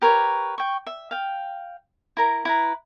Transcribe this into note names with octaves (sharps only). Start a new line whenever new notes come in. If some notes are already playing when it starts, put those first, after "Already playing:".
G4 A#4 B4 C#5
G5 C#6
E5
F5 G5
E4 A#4 A#5
E4 B4 A#5